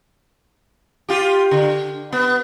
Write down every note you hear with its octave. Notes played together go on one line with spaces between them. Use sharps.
F4 G4
D3
B3